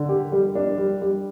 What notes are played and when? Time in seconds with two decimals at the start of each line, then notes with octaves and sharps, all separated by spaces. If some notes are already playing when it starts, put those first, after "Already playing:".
Already playing: D3
0.09 G4
0.32 G3
0.55 D4
0.78 G3
1.02 G3